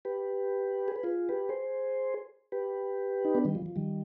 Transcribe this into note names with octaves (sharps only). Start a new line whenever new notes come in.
G4 B4
G#4
B4
F4 G#4
G4 B4
G#4 C5
G4 B4
D#4
B3 D4
D#3 G3
F3
F3
D#3 G3